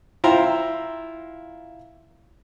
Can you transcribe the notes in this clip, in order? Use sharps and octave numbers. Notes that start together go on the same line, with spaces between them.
E4 F4 C5 F5 G5 A#5